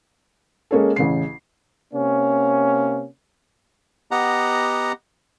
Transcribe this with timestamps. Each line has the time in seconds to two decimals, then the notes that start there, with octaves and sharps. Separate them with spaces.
0.71 G#3 A#3 C#4 G#4 A4
0.96 A1 C#3 C7
1.94 C3 A#3 C#4
4.11 B3 G4 D#5 F#5 A#5